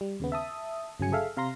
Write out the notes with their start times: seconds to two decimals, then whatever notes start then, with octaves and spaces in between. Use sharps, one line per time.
0.01 G3
0.20 D#2 C#3 B3
0.32 E5 A5 D#6
1.00 G1 C#3 F#3 G#5 C#7
1.12 G#4 A4 E5 F5
1.37 C3 F5 A#5 C6 A#6